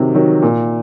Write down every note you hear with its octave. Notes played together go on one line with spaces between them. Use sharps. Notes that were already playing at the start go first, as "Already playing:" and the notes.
Already playing: C3 D#3 F#3
D#3 F#3
A#2